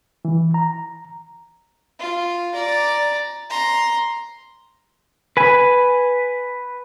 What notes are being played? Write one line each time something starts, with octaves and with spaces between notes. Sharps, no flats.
E3
A#5
F4
D5 A#5
A#5 C6
B4 G#5